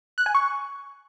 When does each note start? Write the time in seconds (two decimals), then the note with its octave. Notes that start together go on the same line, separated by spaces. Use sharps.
0.18 F#6
0.26 G#5
0.35 C#6